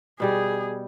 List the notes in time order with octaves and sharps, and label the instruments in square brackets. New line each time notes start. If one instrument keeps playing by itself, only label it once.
[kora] B2 G3 G4 [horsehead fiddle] G#4